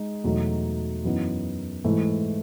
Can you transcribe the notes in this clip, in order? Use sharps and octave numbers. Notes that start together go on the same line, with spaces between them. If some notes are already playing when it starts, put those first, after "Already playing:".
Already playing: G#3 D#4
E2 B2 F#3 A3 D#4
F#2 E3 B3 D#4
G#2 E3 A3